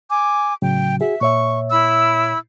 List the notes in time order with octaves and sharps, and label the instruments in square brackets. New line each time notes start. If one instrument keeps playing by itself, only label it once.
[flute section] G#5 D6
[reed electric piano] A2 C#3 F#3 [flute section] G5
[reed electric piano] F#4 G#4 [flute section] E5
[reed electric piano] A#2 C#5 E5 [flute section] C#6
[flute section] E4 B5 E6